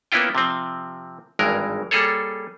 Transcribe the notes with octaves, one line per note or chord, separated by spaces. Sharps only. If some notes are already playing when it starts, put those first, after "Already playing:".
A#3 B3 C#4 E4 F4 G5
C3 F3 C4
G#1 G2 E3 G#3 A#4
G3 A#3 G#4 A4 C#5